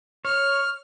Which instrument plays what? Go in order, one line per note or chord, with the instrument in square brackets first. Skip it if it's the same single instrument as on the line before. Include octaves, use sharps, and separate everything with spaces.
[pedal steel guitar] C#5 [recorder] F6